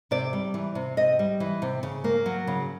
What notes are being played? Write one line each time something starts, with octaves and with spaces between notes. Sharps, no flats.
C3 D5
G3
E3
C3
C3 D#5
G3
E3
C3
C#3
A#3
F#3
C#3